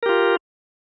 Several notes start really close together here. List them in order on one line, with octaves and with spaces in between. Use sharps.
A#4 G4 F4